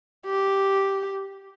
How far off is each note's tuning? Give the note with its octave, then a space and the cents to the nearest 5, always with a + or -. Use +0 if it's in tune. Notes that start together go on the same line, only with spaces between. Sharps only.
G4 -5